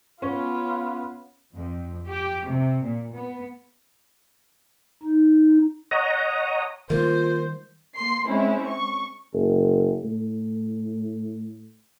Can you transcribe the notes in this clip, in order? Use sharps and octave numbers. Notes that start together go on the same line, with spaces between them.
B3 C#4 F4
F2
G4
C3
A#2
B3
D#4
C#5 D#5 F#5 A#5 D#6
D#3 G3 A#3 F4 C5
A#3 C6 C7
G#3 C4 C#4 E4
C#6
F#1
A2